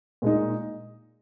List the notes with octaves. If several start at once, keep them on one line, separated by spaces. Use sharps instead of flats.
A#2 G#3 D#4